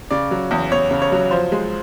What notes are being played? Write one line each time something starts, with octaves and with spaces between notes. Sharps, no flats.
C#3 D5
F#3
E2
E2 C#5
C#3
C#5
F#3
F3 C5
G#3